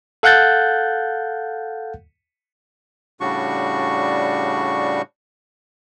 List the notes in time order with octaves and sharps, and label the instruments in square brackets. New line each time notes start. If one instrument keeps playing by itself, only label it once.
[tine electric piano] A4 F5 F#5 F#6 G6 A6
[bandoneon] A2 C#3 G3 D4 F#4 C#6